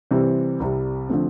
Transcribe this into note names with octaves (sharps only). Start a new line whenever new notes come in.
C3 E3 G3 C4
C2 C3 G3
D3 F3 A3 C4